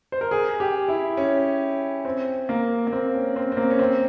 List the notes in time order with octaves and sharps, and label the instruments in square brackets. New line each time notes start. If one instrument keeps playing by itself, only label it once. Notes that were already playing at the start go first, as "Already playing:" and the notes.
[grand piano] C5
A#4
G#4
G4
E4
C#4
C4
A#3
A#3
C4
C#4
C4
C4
A#3
C#4
C4